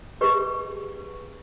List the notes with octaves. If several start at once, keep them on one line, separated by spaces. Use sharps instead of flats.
G4 G#4 B4 C#6